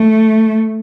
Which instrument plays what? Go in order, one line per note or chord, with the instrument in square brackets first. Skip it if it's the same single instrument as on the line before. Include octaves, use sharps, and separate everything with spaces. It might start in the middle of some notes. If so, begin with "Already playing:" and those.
Already playing: [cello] A3